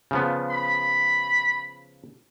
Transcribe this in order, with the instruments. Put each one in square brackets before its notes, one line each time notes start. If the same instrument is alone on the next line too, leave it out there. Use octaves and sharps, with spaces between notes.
[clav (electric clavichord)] C#3 F3 B3
[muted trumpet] B5